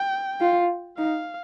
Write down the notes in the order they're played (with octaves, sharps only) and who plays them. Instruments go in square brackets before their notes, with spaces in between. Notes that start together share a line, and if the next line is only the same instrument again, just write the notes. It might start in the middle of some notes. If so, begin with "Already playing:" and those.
Already playing: [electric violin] G5
[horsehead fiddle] F4
[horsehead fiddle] D#4 [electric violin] F5